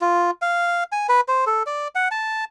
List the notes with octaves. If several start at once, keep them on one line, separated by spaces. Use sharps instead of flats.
F4
F5
G#5
B4
C5
A4
D5
F#5
A5